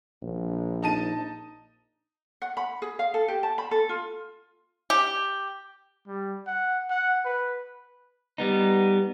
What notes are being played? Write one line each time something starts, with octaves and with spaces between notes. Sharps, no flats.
A#1
D#4 A5 D#7
F#5
B5
G#4
F5
A4
G4
A5
B5
A4
F4
G4
G3
F#5
F#5
B4
G3 B3 D#4